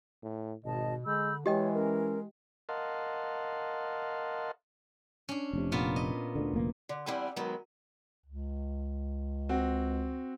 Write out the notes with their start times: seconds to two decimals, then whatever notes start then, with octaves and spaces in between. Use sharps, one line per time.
0.23 A2
0.65 G#1 B2 D#5 A5
1.06 D3 G#3 B5 E6 G6
1.46 E3 G#3 G4 C#5 D#5 G5
1.75 C#4 A#4
2.69 A#4 D#5 F5 F#5 A5 C6
5.29 C#4 D4
5.53 F1 C3
5.72 A#2 B3 F4
5.96 D#5
6.35 D2 D3
6.53 F1 D2 A#3
6.89 D3
7.06 E2 G3 C4 E4 F#5 G#5
7.36 D#3 F#3 G#3 B3
8.26 C#2
9.49 C4 F#4